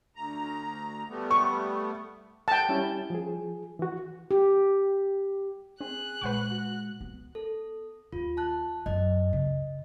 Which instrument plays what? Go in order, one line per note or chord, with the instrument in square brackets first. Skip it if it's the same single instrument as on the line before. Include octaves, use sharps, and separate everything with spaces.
[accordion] D2 A#5
G3 A3 B3
[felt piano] C#6
[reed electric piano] F#5 [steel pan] G5 A5
[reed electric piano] G3 C#4 E4
F3 G#4
E3 F#4
[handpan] G4
[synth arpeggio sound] C4 [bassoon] G#4 [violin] F#6
[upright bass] A#2 G#3 [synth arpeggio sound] B4 F#5 C#6
[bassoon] F#4
[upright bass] B3
[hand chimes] A4
[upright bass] D#2 [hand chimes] F4
[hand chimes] A5 F#6
[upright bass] F#2 [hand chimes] D#5
[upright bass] C#3